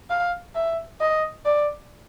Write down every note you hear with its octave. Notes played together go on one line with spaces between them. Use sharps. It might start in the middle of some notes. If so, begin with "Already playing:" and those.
F5
E5
D#5
D5